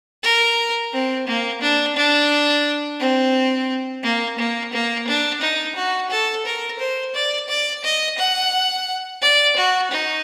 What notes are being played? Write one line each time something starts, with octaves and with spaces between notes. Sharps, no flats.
A#4
C4
A#3
D4
D4
C4
A#3
A#3
A#3
D4
D#4
F#4
A4
A#4
C5
D5
D5
D#5
F#5
D5
F#4
D#4